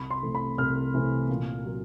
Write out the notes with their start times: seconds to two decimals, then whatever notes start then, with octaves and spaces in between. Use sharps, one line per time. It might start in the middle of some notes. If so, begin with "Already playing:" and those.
Already playing: C2 B5
0.11 C6
0.22 C3 E3 A3 C4
0.35 B5
0.58 C2 F6
0.94 C3 E3 A3 C4
1.29 A#2
1.64 F#3 A#3